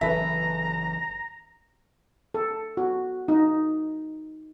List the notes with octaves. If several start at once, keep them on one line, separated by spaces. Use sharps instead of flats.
F#1 E3 C#4 A4 B4 E5 A#5
A4
F#4
D#4